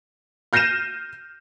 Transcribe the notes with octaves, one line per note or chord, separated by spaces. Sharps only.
F6 G6 A#6 C7 D#7 E7